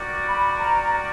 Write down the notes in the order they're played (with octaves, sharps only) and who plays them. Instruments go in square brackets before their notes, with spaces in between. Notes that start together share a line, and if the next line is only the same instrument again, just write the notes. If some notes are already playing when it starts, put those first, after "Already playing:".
Already playing: [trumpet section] F#4 A#4 D5 G5
[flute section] B5
A#5